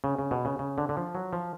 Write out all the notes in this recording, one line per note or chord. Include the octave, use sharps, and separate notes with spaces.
C#3
C#3
B2
C#3
C#3
D3
D3
F3
F#3
F3